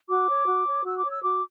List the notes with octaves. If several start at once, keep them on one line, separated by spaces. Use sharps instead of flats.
F#4 D6
C#5
F#4
C#5
F#4 E6
D6
C#5
E6
F#4 D6